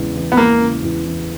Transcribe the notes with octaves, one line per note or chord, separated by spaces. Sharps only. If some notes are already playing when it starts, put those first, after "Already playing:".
Already playing: E2 C#3 G#3
E3
B3
G#3 A#3
C#3
E2
E3